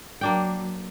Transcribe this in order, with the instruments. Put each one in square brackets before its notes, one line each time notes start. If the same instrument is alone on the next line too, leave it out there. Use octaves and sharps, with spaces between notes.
[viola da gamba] F#3 [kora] A#3 D4 G5